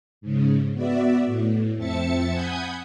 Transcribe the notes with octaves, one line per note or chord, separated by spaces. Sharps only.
G#2 C#3
B3 F#4 D5 E5
A2
F2 C4 E5 A5 A6 C#7
F#5 G#5 B5 D#6 G6 G#6